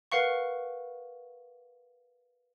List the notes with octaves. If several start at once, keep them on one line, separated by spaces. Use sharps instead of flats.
A#4 B4 F5 F#5 C#6